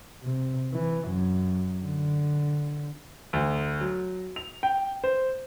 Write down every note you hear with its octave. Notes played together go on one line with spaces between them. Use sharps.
C3
E3
F#2
D3
D2
F#3
F7
G5
C5